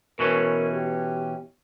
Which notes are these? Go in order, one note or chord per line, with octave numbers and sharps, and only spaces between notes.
B2 E3 C#4 A#4
G4